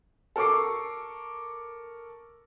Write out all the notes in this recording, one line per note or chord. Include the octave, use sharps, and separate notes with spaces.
A4 A#4 C#6 D6 C7